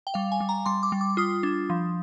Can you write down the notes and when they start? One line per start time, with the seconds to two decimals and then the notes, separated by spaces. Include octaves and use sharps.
0.07 G5
0.14 G3 F5
0.32 G#5
0.40 G3
0.49 A#5
0.66 G3 C6
0.83 D6
0.92 G3
1.01 D6
1.17 F4 D#6
1.43 D4
1.70 F3